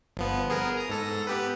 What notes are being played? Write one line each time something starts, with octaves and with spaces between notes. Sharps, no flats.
G1 F3 B3
B3 G#4 A#4
A#5 D#6
G#2 A4 A#6
B3 G4 B4